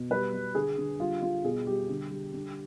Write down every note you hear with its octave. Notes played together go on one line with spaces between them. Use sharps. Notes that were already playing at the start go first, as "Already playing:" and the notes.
Already playing: B2
G3 B4
G3
D3 G#4
D3
G3 F4
G3 F4
B2 G#4
G3 G4
D3
G3
D3